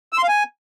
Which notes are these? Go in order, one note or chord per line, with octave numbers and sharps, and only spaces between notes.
E6
C6
F5
G#5